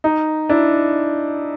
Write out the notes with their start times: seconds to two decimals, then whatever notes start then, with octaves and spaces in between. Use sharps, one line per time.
0.04 D#4
0.49 D4 E4